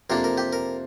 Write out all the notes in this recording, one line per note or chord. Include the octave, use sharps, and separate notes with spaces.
F2 C3 A#3 D4 A#4
A#4
G4
A#4